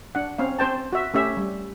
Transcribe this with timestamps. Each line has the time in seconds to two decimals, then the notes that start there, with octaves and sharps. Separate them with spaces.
0.15 D4 F#5
0.38 C4 C#4 F5
0.59 C4 C5 G5 A5
0.93 F#4 E5
1.14 A3 C#4 G4 E5
1.37 G3